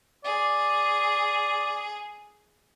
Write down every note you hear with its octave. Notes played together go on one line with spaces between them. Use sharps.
G#4 D5